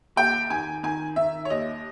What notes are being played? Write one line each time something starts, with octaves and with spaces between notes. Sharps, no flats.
D#2 G5
D#3 G#5
D#3 G#5
D#3 E5
C#5
D#2 D#5